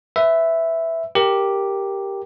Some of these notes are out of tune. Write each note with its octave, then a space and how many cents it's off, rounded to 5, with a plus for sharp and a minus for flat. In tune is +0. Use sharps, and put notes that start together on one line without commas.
B4 +25 E5 +0
G4 +0 A#4 +0